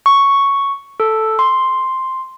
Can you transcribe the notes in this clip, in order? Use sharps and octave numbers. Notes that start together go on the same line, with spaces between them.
C#6
A4
C6